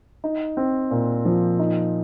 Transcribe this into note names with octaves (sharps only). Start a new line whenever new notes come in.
D#4
C4
A#2
F3
D#4